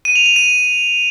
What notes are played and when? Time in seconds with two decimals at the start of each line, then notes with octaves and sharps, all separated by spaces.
0.05 D#7
0.16 F7
0.26 F7
0.36 D#7